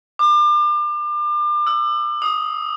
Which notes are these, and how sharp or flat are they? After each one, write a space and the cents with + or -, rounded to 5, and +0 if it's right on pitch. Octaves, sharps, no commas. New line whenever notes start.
D6 +35
E6 +5
D#6 +5